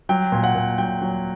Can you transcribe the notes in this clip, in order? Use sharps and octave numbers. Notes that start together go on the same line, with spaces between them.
F#3 G5
A#2
F#5
A#2
F#3 G5
F#3